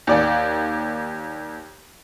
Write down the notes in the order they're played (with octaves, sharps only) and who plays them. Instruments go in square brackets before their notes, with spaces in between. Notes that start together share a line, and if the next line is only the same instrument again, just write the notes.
[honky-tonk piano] D#2 D5